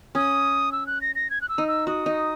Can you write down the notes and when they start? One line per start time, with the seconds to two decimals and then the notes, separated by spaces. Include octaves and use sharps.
0.15 C#4 D#6
0.72 E6
0.87 F#6
1.01 A#6
1.15 A#6
1.30 G#6
1.42 F#6
1.49 E6
1.58 D#4
1.68 E6
1.87 F#4 D#6
2.06 D#4